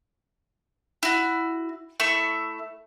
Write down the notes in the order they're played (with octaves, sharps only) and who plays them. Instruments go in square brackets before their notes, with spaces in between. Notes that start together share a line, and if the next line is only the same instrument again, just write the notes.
[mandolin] E4 F#4
A3 E4 E5 C#6